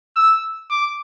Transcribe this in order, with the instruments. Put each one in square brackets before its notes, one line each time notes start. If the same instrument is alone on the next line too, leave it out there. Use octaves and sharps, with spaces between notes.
[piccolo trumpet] E6
D6